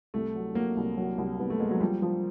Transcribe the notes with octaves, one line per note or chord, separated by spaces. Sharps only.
C2 A3
F#3
F#3 A#3
C2
F#3
C2
C2 B3
A3
G#3 A#3
F#3
F3 G3
F3